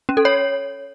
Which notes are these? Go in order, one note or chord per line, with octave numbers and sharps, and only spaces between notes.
C#4
A4
C#5